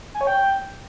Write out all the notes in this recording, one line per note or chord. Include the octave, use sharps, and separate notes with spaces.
G#5
C#5
G5